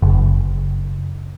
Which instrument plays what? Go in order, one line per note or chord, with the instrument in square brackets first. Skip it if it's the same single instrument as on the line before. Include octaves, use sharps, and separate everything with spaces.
[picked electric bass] F#1